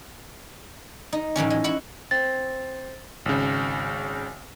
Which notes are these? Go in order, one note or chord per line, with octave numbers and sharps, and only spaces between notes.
D#4
A2 E3 F#3 C#4
G#3
E4 F#4 F#5
C4 A6
G#1 C#3